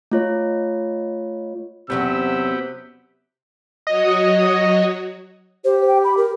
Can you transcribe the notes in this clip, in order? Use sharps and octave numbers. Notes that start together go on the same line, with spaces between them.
A3 F4 C#5
E2 C3 F#3 B3 C#4 G4 E6
F#3 F#4 C#5 D#5
G4 C5
G5
B5
A#4